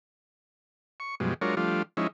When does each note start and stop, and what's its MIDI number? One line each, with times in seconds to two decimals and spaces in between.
1.00 1.15 85
1.20 1.34 42
1.20 1.34 47
1.20 1.34 53
1.20 1.34 55
1.20 1.34 56
1.41 1.55 54
1.41 1.55 56
1.41 1.55 62
1.41 1.55 65
1.41 1.55 70
1.41 1.55 73
1.57 1.82 53
1.57 1.82 55
1.57 1.82 57
1.57 1.82 62
1.57 1.82 65
1.97 2.07 53
1.97 2.07 56
1.97 2.07 61
1.97 2.07 63
1.97 2.07 64